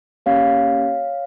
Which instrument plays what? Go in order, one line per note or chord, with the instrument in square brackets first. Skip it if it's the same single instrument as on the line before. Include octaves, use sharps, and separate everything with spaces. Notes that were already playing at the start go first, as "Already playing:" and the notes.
[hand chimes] A#3 C#4 G4 C#5 F5